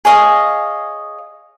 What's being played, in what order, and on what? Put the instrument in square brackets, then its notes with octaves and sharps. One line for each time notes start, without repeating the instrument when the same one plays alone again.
[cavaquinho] G#4 C#5 D#5 F5